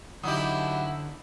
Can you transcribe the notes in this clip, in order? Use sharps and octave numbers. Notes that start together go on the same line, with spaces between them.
D3 F#3 D#4 E4 G4 D#6